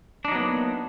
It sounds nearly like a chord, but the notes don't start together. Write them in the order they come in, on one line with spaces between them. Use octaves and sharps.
D4 D#4 F#3 B3 A#3